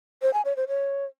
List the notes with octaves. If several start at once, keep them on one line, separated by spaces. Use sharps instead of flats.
C5
G#5
C#5
C5
C#5